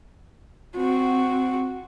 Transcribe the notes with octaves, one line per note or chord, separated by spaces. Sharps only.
C4 F#4